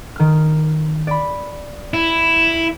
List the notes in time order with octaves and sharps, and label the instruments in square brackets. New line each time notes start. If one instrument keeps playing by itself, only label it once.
[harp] D#3 F6
D5 B5
[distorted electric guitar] E4